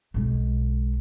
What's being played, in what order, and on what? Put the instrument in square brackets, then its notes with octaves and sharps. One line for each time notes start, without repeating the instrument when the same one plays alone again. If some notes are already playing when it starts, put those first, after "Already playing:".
[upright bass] B1 G#3